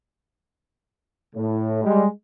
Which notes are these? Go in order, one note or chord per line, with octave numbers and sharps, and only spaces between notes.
A2
G3 G#3